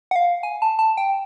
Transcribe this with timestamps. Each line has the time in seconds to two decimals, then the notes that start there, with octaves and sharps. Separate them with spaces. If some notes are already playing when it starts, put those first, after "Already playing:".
0.11 F#5
0.16 F5
0.43 G#5
0.62 A5
0.79 A5
0.97 G5